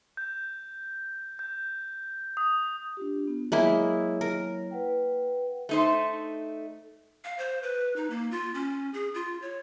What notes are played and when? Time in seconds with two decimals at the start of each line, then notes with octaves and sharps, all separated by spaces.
0.17 G6
1.39 G6
2.37 D#6
2.97 D4 F4 G4
3.27 B3 F4
3.52 F#3 G#3 A#3 E4 C#5
4.21 A#4
4.71 B4 F#5 G5
5.69 A3 D#4 C5
7.24 F5
7.38 C5
7.63 B4
7.96 D#4
8.10 A#3
8.31 F4
8.54 C#4
8.94 G#4
9.14 F4
9.42 C#5